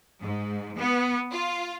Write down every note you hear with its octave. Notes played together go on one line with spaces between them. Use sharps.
G#2
B3
F4